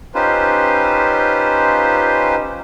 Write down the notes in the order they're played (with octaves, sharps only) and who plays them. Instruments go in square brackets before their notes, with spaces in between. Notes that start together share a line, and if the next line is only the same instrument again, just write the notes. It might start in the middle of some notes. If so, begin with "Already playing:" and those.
[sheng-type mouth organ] C#4 D#4 F4 G4 B4 C5